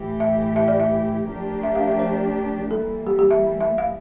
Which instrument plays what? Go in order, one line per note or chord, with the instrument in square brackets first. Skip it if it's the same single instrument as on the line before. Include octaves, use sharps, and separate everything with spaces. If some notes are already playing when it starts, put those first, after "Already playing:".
Already playing: [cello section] A2 E3 A3 E4 G4
[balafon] E5
E5
D5
E5
[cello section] F3 A3 D4 G4 A#4
[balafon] E5
F5
E5
C5
[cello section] E3 G3 A#3 E4 [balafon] A4
[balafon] G4
G4
E5
E5
F5